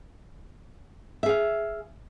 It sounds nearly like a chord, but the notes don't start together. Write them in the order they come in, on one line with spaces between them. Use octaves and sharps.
E5 G#4 F5